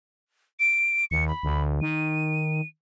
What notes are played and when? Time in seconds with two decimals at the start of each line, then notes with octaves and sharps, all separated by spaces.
0.60 D7
1.11 D#2 C#7
1.28 B5
1.43 D2
1.81 D#3 D#7